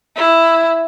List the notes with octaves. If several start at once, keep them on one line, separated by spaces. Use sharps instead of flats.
E4